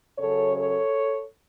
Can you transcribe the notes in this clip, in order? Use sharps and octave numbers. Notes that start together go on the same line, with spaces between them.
F#2 C#3 F#3 A4 C#5
A4 C#5